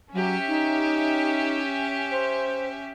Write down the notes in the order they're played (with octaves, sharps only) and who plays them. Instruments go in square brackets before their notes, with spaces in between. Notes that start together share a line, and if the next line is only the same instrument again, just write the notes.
[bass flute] F#3 [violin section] C#4 G4 E5
[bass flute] D#4
C5